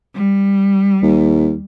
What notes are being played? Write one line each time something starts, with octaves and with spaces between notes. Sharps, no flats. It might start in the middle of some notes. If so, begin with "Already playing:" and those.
G3
D#2